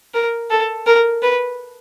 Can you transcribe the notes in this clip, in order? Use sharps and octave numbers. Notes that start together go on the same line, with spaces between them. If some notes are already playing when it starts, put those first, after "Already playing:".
A#4
A4
A#4
B4